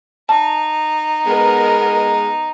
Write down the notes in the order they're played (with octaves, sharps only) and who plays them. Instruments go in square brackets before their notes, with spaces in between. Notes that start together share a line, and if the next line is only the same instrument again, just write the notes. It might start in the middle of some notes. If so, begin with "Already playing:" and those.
[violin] D#4 [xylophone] A5
[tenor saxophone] G#3 [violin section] B3 A#4